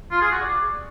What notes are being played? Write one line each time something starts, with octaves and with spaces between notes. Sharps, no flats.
F4
G#4
F#4
D5